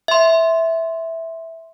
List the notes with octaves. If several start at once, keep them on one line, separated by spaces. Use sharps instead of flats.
E5 C6